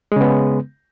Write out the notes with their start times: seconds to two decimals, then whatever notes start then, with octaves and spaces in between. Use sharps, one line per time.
0.12 G#3
0.16 C#3
0.21 B3